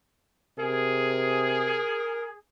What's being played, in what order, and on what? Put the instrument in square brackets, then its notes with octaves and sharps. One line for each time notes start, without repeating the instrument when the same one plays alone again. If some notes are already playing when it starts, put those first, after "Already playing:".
[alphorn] C3 [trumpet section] G#4 [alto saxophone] A#4